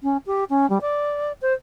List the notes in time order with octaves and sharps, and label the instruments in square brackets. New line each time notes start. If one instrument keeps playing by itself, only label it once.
[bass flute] C#4
G4
C#4
G3
D5
C5